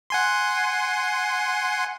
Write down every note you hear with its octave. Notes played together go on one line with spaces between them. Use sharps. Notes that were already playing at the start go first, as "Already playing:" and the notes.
F#5 G#5 C6